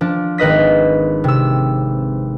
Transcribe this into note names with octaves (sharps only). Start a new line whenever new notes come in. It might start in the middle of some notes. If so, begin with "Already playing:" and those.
F3 D4
G#1 B4 D#5 B6
C3 E6